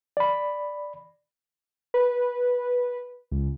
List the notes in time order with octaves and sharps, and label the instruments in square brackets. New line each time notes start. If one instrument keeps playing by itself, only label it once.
[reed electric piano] D5 B5
[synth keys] B4
C#2